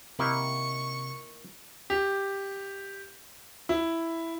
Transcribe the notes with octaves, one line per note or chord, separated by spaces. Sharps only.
C3 D#3 A#3 E4 C#6
G4
E4